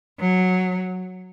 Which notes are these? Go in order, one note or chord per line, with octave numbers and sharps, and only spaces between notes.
F#3